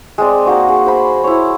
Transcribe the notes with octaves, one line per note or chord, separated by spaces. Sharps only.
G#3 C4 D5
A#3 D#4 F#4 C#6
G#4
C5 B5
E4 C#5